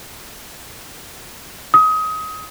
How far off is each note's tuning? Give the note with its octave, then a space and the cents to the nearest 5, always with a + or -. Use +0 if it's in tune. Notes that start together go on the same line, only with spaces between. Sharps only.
D#6 +25